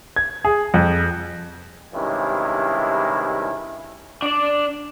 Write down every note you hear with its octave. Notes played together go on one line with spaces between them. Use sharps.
G#6
G#4
F2
G2 C3 D#3 G#3 C#4 E4
D4 D5